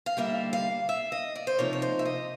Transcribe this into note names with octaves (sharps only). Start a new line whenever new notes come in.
F5
D#2 D3 G3 A#3 D4 E5
F5
E5
D#5
D5
C5
C3 F3 A#3 D#4 C#5
C#5
C5
E5
D#5